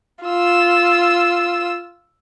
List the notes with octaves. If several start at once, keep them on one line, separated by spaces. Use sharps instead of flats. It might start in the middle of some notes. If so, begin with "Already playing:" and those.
F4 E6